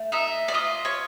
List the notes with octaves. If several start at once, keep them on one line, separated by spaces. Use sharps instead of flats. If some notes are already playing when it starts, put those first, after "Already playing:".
Already playing: A3
D#4 E5
D5
F4 D#5
C#5